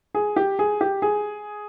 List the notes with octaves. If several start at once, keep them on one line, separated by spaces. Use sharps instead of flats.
G#4
G4
G#4
G4
G#4